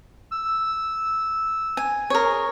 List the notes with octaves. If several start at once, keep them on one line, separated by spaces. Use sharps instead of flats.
E6
G#5
G#4 A#4 C#5